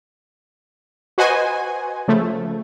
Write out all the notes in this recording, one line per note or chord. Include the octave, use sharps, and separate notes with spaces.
F#4 B4 C5 D#5 F#5 G#5
C#3 F3 A3